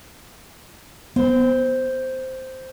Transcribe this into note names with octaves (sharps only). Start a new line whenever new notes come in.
B3 C5